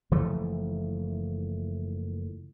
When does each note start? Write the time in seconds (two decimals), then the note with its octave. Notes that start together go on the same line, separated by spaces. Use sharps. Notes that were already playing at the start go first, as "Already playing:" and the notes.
0.11 F#1 E3 F3 A3